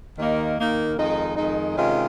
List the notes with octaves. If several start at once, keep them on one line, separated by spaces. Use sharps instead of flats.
D#2 D#3 A#3 D#4
D#2 D#3 A#3 D#4
F2 D#3 G#3 D#4
F2 D#3 G#3 D#4
C3 D#3 G#3 C#4 F4